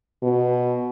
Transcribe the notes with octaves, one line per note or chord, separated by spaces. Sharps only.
B2